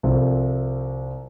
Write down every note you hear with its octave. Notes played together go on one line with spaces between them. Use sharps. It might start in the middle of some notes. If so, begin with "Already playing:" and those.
C2 C3 F3 C4 F4 A4